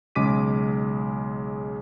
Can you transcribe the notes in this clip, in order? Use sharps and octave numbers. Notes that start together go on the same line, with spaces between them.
B1 C#3 G#3 D6 B6 D#7